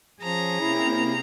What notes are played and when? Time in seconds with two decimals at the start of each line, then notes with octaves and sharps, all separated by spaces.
0.23 F3 C#4 G#4 A#5
0.60 C3 A#3 C4 E4